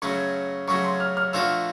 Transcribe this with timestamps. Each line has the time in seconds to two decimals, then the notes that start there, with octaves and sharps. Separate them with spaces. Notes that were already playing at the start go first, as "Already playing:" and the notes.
0.02 F#2 C#3 F#3 A3 C#6
0.68 F#2 C#3 F#3 A3 C#6
0.84 C6
1.00 F6
1.17 F6
1.33 A#2 F3 A3 D4 F#4 E6